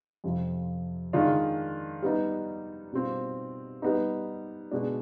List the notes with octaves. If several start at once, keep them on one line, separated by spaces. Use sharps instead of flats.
F2 C3 F3
D#3 G#3 D4 F4
G3 B3 D#4
B2 G3 C4 F4
G3 B3 D#4
B2 G#3 D4